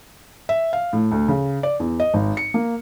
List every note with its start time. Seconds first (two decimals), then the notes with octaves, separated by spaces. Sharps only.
0.49 E5
0.73 F5
0.93 A2
1.11 D2
1.28 C#3
1.63 D5
1.80 E2
2.00 D#5
2.14 G#1
2.37 C#7
2.54 A#3